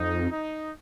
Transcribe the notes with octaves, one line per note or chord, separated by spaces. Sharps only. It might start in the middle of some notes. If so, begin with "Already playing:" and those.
Already playing: F2 D#4
D#4